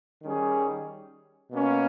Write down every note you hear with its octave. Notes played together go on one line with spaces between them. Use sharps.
D#3 G3 C#4 G#4
B2 A#3 C#4